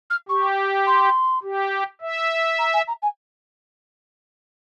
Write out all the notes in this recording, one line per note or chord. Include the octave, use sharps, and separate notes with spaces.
F6
G4 C#6
C6
G4
E5
A#5
G#5
A#5
G#5